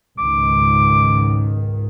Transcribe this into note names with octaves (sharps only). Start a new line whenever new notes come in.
C#2 G#2 D#3 D6